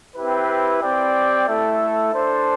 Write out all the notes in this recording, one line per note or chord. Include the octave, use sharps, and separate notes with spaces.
C4 E4 G4 B4
C4 G4 D5 G5
A3 E4 A4 E5
D4 A4 C5